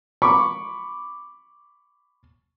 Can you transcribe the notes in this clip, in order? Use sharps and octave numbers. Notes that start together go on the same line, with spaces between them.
B5 C#6 D6